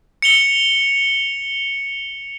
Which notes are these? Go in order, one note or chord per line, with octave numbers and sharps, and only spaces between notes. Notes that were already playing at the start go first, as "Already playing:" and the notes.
C#7 F7 G7